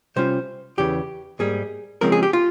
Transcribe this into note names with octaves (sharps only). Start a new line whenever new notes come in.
C3 G3 C#4 F4 C5
E2 C#3 E3 G4
G#2 G3 A#3 G#4
C#3 F3 G#3 C4 A#4
G#4
G4
F4